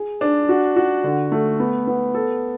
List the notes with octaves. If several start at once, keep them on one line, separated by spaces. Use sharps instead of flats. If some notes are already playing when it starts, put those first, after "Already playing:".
Already playing: G#4
D4
F#4
F#4
D3
A3
B3
B3
A4